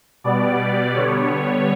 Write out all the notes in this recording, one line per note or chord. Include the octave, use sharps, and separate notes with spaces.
B2 G3 B3 D5
D3 G3 B3 C#5